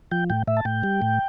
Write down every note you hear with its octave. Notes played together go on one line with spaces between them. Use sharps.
F3 G5
A2 G5
A2 E5
A5
A2 G5
G3
A2